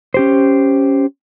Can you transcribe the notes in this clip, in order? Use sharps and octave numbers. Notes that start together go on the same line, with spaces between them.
C#4 G4 C5